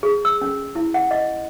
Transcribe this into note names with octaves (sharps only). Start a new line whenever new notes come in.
G#4
E6
C#4
E4
F#5
D#5